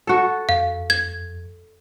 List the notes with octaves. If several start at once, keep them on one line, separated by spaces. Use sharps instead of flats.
F#4 A4
F2 F5
G#6